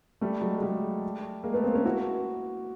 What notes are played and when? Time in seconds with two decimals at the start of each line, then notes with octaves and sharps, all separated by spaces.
0.21 G3 A3
0.41 F#3 G#3
0.58 G#3
0.62 G3 A3
1.44 G#3 A#3
1.54 A3 B3
1.64 A#3 C4
1.74 B3 C#4
1.85 E4 F#4